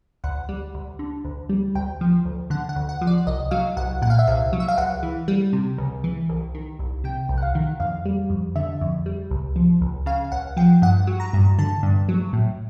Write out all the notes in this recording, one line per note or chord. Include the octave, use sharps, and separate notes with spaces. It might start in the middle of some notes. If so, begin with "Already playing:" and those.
D2 F#5
G3
D2
D3
D2
G3
D2 G5
F3
D2
D3 F#5
F#5
D2
F#5
F3
D5
C2 D#5
F#3 F5
C2 F#5
A#2 F#5
F5
E5
C2 F5
F#3
E5
F5
C#2 F#5
E3
G3
C3
C#2
E3
C2
D#3
C2
C3 G5
C2
F#5
F5
D#3
F2 F5
G3
F2
D3 E5
F2
G3
C#2
F3
C#2
C#3 F5
C#2 F#5
F3 G5
G2 F#5
F#3
A#5
G2
D3 A5
G2
F#3
A2